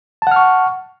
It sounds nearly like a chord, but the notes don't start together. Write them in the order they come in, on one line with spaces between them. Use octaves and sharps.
A5 F#5 F6 C#6